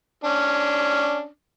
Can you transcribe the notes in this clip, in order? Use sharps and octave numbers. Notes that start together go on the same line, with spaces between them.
C#4 D4